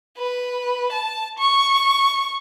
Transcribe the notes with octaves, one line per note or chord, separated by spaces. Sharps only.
B4
A5
C#6